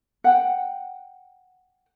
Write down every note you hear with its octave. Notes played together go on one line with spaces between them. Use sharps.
F#5 G5